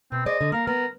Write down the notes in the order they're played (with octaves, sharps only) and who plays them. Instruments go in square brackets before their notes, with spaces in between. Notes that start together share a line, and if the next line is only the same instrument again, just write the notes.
[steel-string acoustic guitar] B2 [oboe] C4
[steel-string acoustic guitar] G#4 C5 D5 [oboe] D#5
[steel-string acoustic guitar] D3
[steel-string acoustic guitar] A#3 F5 [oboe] A#4
[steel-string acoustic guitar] B3 [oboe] A#4